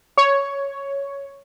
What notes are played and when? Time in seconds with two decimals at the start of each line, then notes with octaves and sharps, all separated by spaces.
0.18 C#5